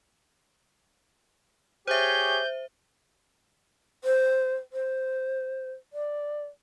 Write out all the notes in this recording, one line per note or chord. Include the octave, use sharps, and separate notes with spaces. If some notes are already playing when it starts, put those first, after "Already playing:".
G4 G#4 C5 C#5 E5 G6
C5
C5
D5